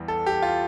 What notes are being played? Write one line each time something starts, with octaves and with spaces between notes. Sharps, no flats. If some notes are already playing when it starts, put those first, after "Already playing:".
Already playing: E2 E3 G3
A4
G4
F4